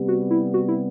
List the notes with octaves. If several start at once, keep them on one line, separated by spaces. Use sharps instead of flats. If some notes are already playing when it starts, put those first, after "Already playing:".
Already playing: C3 G3 B3
F#4
E4
F#4
E4